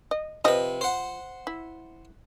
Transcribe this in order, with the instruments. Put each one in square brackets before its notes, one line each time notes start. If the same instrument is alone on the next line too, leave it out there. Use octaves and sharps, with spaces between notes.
[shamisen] D#5
[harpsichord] C3 B4 [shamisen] F3 D#5
[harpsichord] C5 F#5
[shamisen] E4